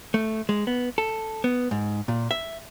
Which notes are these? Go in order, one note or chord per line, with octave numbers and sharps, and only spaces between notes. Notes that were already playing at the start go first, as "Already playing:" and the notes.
A3
G#3
B3
A4
B3
G#2
A#2
E5